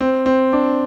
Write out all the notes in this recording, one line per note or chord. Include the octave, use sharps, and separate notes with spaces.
C4
C4
D4